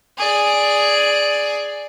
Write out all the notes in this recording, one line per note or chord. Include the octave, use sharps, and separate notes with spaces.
G#4 D5